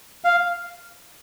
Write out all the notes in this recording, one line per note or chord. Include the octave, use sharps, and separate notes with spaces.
F5